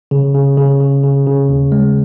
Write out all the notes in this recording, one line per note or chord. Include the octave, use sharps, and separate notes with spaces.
C#3
C#3
C#3
C#3
C#3
C#3
D#2
G#3